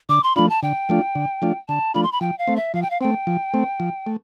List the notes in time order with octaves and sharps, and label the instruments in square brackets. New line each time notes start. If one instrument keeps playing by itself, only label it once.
[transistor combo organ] D3 [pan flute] D6
[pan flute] C6
[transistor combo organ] F3 A3 D4 F4 [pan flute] B5
[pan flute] A5
[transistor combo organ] D3 [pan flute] G5
[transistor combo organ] F3 A3 D4 F4
D3
F3 A3 D4 F4
[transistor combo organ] D3 [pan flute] A5
[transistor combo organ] F3 A3 D4 F4 [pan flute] B5
[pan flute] C6
B5
[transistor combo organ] F3 [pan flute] G5
[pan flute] F5
[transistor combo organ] A3 C4
[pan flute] E5
[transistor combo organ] F3 [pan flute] F5
[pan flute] G5
F5
[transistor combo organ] A3 C4 [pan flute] G5
[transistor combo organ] F3
A3 C4
F3
A3